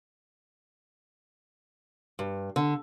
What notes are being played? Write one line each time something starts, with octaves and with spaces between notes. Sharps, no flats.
G2
D3